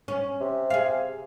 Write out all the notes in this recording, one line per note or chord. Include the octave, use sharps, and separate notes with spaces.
C#4
C3
G#4 F5